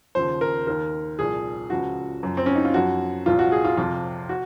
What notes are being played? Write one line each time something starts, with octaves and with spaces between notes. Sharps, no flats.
D#2 C#3 F3 C5
A#4
D#2 D#3 A#4
C2 A#2 F3 G#4
C#2 C#3 F3 F#4
F#2 F3
C4
C#4
D#4
F4
F#2 F3 F#4
C2 A#2 F3 F4
F#4
G#4
F4
F2 C3 F3 F4
F#4